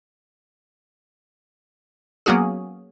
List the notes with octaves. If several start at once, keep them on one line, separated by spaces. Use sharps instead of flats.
F#3 A#3 B3 C#4 F#4 G#4